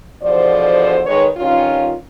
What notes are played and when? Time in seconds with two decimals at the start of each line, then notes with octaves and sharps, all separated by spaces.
0.21 E2 B2 D3 F3 C5 D5
1.06 D#3 G#3 B4 C#5
1.36 G2 D#3 C#4 F4